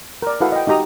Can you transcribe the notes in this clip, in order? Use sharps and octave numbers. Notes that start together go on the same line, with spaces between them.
A#4 D5
E4 F#4 A4 B4 F5 F#5
D#5 G5
D#4 F#4 G4 A#5 D#6